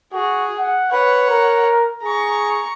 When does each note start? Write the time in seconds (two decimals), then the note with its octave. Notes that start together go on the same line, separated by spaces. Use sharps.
0.14 F#4 G#4
0.59 F#5
0.92 B4 C#5 F#5
1.30 A#4
2.03 G#4 A#5 C#6